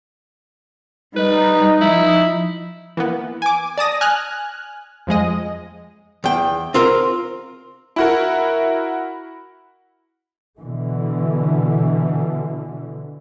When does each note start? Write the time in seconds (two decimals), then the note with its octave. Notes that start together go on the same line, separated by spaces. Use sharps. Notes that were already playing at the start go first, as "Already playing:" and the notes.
1.16 G3 D#4 B4
1.81 F3 E4
2.97 E3 A#3 B3
3.42 G#5 D6
3.78 D5 A5 D#6 A#6
4.01 G#5 F6 F#6
5.07 F2 F3 G#3 D#5
6.24 E2 G5
6.74 C4 F4 A#4
7.96 E4 F#4 A#4
10.59 B2 D3 E3